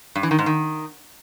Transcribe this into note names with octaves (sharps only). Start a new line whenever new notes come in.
G2
E3
D#3
G#2
D#3